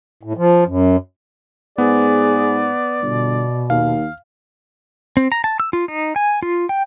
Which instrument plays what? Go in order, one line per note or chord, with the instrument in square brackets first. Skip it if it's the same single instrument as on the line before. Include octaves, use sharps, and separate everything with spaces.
[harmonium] A2
F3
F#2
[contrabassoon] G#2 [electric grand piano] B3 [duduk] G#4 [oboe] D5
[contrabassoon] G1 [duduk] B2
[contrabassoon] D#2 [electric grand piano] F5
[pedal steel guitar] C4
A#5
A5
E6
F4
D#4
G#5
F4
G5